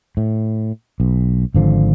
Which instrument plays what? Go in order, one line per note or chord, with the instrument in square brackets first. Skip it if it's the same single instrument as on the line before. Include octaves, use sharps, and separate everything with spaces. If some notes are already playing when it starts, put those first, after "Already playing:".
[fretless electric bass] A2
B1
G#1 D3 F3